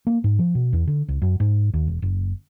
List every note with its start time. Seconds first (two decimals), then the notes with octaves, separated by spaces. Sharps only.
0.07 A#3
0.24 G#2
0.39 F3
0.55 B2
0.73 E2
0.87 D3
1.08 C#2
1.22 F#2
1.40 G#2
1.74 D#2
1.87 E1
2.02 F#1